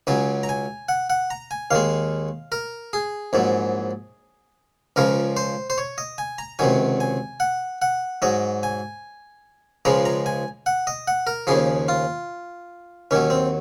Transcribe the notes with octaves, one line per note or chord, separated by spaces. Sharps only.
C#2 C#3 F#3 G#5
A#5
G#5
F#5
F#5
A#5
G#5
D#2 D#3 G#3 F5
A#4
G#4
A#1 G#2 F#3
C#2 C#3 F3 A#4
C5
C5
C#5
D#5
G#5
A#5
C#2 C3 D#3 F#3 G#5
G#5
F#5
F#5
G#2 F#3 D#5
G#5
C#2 C#3 F3 G#3 A#5
A#5
G#5
F#5
D#5
F#5
A#4
D#2 C#3 F3 G#4
F4
D#2 D#3 F#3 C#4
C4